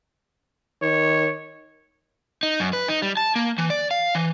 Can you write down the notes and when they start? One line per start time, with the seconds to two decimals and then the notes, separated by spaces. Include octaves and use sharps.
0.82 D#3 C#5
2.43 D#4
2.60 F#2
2.73 B4
2.88 D#4
3.02 G3
3.17 A5
3.36 A#3
3.58 E3
3.70 D5
3.91 F5
4.15 E3